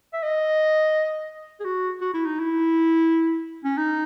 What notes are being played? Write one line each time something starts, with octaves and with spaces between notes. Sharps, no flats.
E5
D#5
G#4
F#4
F#4
E4
D#4
E4
C#4
D#4